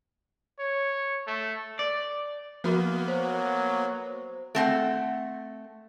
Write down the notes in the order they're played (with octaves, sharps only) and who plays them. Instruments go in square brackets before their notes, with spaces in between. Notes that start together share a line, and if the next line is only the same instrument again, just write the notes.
[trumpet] C#5
A3
[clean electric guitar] D5
[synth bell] F3 F#4 A#4 [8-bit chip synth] A#3 B3
[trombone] F#3 [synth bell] C5
[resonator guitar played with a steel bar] A3 C4 F#5